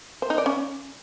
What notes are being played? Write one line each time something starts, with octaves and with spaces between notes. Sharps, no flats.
C5
D#4
D5
C#4